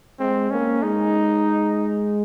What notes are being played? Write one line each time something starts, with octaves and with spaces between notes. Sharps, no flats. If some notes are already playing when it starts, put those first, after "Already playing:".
G#3 C4
A#3 C#4
G#3 D#4